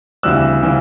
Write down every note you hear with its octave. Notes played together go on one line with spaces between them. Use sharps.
D2 C#3 E3 G3 C4 E6 F#6
C#3 E3 G3 C4